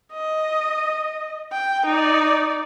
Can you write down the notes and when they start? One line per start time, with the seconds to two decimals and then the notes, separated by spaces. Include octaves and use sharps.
0.13 D#5
1.52 G5
1.86 D#4 D5